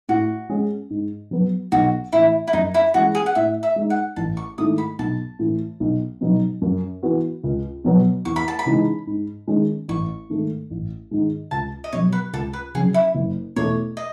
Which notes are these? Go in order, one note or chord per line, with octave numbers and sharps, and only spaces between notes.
A2 F#4
G#3 C#4 G#4
G#2
F#3 B3
B1 F#4
A2 E3 E4
E4
F#2 D#4
E4
E3 G#3 C#4 F#4 G#4
G#4
F#5
A2 E5
E5
G#3 D#4
F#5
A1 A5
C#6
G#2 D#3 A3 E4 D#6
B5
B1 A5
A2 E3
B1
B2 F#3 B3 D#4
F#2
E3 B3 F#4
C#2
B2 F#3 B3
E2 C#6
B5
A5
B5
C#3 E3 G#3 D#4
G#2
D#3 G#3 C#4
A1 C#6
G#2 D#3 A3
A1
G#2 D#3 G#3
C#2 A5
D#5
B2 F#3 C#5
B4
C#2 A4
B4
C#3 F#3 C#4 G#4
E4
F#1
E2 B2 A3 C#5
D#5